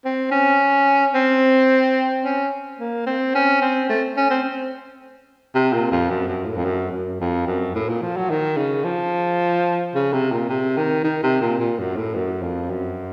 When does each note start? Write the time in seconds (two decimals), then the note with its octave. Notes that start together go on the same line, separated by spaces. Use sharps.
0.05 C4
0.31 C#4
1.14 C4
2.24 C#4
2.79 A#3
3.07 C4
3.35 C#4
3.61 C4
3.89 A3
4.17 C#4
4.30 C4
5.55 C3
5.73 A#2
5.92 F2
6.10 F#2
6.28 F#2
6.46 A2
6.56 F2
6.65 F#2
6.92 F#2
7.20 F2
7.47 F#2
7.75 A2
7.89 A#2
8.02 F3
8.17 F#3
8.30 D#3
8.57 C#3
8.84 F3
9.95 C#3
10.13 C3
10.32 A#2
10.49 C3
10.77 D#3
11.04 D#3
11.23 C3
11.41 A#2
11.59 A#2
11.79 F#2
11.97 A2
12.15 F#2
12.42 F2
12.70 F#2